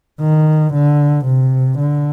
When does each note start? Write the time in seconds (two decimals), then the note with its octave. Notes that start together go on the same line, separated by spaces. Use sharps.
0.21 D#3
0.73 D3
1.26 C3
1.79 D3